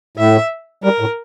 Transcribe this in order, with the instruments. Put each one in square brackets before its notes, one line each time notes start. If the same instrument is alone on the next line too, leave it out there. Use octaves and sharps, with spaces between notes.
[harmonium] A2 [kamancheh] E5
[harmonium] G3 [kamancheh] A#4
[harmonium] A2